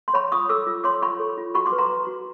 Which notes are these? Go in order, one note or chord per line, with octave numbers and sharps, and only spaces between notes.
C6
C#5 B5 C#6
F4 C#6 D#6
A4 D6 E6
F4
C#5 C6 D6
F4 B5 C#6
A4
F4
F#4 B5 C#6
C6 D6
B4
A#5 C6
B4
F#4